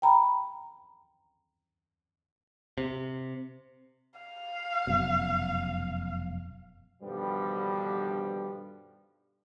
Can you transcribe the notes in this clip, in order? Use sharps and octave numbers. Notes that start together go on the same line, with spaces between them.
G5 A#5 B5
C3
F5
F1 F#2 B2
G2 B2 D3 D#3 F3 G3